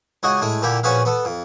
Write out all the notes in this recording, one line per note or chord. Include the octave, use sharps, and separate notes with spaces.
C#2 F#4 G#4 D#5
A2 G#3 A3
A#2 D3 E4 G4
A#1 C#4 F#4 G#4 B4 F5
B3 A4
F2